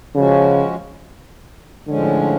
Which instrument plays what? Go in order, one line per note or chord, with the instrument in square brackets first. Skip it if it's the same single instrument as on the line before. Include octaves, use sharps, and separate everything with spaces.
[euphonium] C#3 [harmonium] F3 G#3 C#4 F#4
[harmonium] A2 F3 G#3 C#4 [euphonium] D3